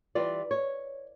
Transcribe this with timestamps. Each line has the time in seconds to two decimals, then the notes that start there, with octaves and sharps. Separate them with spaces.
0.15 E3 G3 F4 D5
0.51 C#5